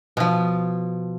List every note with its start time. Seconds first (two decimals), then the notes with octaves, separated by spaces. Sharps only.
0.17 B2 F3